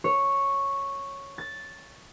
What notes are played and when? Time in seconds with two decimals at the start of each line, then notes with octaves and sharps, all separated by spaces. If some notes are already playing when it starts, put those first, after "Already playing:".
0.04 C#5
1.38 A6